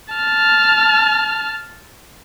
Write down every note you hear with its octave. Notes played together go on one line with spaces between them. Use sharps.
A5 F6